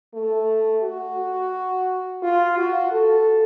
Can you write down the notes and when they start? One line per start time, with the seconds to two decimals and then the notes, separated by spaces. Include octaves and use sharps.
0.14 A3
0.83 F#4
2.22 F4
2.58 F#4
2.92 A4